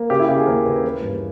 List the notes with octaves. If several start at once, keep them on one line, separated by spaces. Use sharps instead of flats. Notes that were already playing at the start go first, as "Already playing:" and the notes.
Already playing: A#3
C#3 G4
E4
C#3 G4
G#4
D#2 A#4
C#3 B4
E3 B4
G2